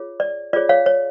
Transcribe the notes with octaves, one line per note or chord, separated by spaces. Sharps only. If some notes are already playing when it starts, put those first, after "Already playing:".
Already playing: F4 G#4 C#5
D5
F4 G#4 C#5 D5
C#5 F5
C#5